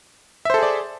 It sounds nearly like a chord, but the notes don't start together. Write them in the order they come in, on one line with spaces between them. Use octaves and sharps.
E5 C5 A4 G#4 D5